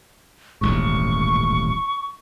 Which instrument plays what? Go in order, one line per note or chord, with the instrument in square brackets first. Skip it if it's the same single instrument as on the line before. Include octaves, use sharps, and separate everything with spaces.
[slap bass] D#1 A1 G#2 [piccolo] C#6